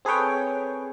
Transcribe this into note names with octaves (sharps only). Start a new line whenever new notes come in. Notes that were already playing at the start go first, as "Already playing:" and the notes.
C4 G#4 A4 B4 C#5 G5